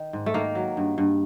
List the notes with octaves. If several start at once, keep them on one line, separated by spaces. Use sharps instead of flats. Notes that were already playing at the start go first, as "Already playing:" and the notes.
Already playing: D#3
G#2
A3
D#3 A#3
F#3
G2
G2